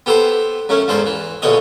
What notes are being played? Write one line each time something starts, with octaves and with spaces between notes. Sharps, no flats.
B3 G4 A4 B4 C5 A5
F#2 A3 C#4
E2 G#2 A4 C5
E3
A#1 B2 D3 C#5 D#5